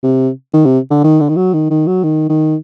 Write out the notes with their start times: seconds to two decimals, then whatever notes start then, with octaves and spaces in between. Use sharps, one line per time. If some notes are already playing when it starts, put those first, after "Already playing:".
0.03 C3
0.54 D#3
0.66 C3
0.91 D3
1.04 D#3
1.20 D3
1.29 D#3
1.36 F#3
1.54 D#3
1.70 D#3
1.87 F#3
2.04 D#3
2.29 D#3